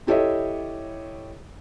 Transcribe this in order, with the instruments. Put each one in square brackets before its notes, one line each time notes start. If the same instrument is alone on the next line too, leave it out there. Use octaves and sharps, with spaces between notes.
[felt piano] E4 G4 A4 C#5 D#5 E5